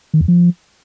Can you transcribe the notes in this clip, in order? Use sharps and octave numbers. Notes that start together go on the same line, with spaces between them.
D#3
E2
F3